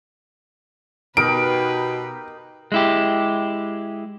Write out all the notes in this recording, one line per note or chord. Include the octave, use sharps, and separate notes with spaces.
B2 D#4 G4 A#4 B4 D7
G#3 E4 G4